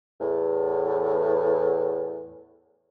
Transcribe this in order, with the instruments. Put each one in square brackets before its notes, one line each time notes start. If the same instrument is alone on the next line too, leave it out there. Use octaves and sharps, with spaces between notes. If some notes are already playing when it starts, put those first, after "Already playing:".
[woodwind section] E2 A2